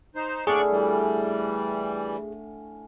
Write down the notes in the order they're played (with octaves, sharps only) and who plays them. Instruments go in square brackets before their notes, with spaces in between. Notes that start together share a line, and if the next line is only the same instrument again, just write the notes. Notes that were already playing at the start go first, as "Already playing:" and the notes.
[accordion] D#4 C5
[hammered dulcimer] A2 D3 C#4 [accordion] D4 D5 C#6 [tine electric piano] G#4
[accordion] E3 G3